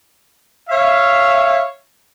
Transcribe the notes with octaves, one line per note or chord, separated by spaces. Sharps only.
C#5 E5 F5